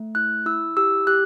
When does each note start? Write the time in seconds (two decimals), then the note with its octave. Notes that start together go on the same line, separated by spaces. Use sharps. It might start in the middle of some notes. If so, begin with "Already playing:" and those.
Already playing: A3
0.15 E4 F#6
0.46 E4 E6
0.77 G4 E6
1.07 G4 F#6